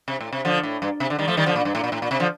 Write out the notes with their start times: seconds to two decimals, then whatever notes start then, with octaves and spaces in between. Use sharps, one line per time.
0.08 C3
0.20 A2
0.33 C3
0.45 D3 F3
0.63 A2
0.82 G2
1.00 C3
1.10 D3
1.19 D#3 G3
1.27 F3 A3
1.37 D#3 G3
1.46 D3 F3
1.56 A#2
1.65 G2
1.75 A2
1.84 A#2
1.92 A2
2.02 A#2
2.11 C3
2.20 D3 F3